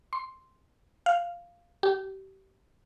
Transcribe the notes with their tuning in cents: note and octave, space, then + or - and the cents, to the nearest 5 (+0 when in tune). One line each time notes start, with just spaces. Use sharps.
C6 +0
F5 -5
G4 -30